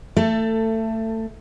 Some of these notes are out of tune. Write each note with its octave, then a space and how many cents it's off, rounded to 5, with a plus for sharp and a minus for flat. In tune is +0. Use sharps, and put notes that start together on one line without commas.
A3 +25 A4 +15